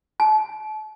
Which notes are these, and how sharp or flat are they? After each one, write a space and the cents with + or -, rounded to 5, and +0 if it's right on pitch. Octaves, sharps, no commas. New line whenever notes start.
A5 -35